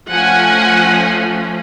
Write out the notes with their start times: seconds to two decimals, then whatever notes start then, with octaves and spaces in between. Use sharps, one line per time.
0.11 F3 A3 C#4 F#5 G#5